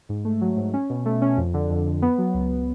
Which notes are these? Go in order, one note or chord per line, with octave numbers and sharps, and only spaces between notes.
G#2
A3
F#3
G#2
C#4
B2
A3
C#4
F2
D3
F2
F2
B3
F#3
C#2